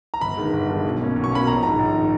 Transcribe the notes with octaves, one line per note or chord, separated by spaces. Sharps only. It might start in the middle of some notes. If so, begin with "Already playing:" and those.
A#5
G1 B5
G2 D#3 G#3
G1
G2 D#3 G#3
B1
B2 A#3 C#4
B1
C#6
B2 A#3 C#4 B5
A#1 A#5
G#2 D#3 A#5
A#1
D#3